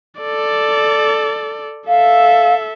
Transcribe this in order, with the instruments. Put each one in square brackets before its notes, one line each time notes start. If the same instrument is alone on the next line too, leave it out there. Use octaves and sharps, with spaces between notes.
[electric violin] A4 D5
[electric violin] A4 E5 [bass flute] F5